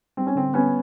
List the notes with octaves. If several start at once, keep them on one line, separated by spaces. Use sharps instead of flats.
G3 C4
C#4
D3 C4
G3 B3 C#4